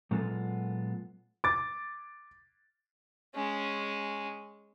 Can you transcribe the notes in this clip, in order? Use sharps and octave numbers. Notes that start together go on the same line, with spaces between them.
A#2 F#3 G#3 B3 F4 A4
D6 A6
G#3 C#4